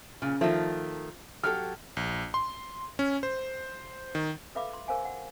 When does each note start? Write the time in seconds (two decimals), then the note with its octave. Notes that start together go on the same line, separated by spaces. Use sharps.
0.22 A#2 C#3
0.41 D#3 F3 A3
1.43 F#3 G4 A4 F6
1.97 A#1
2.34 C6
2.99 C#4
3.23 C5
4.15 D#3
4.55 A4 B4 E5 F5 B5 D6
4.73 C6
4.88 G#4 A#4 C5 F5 G#5
5.05 F#5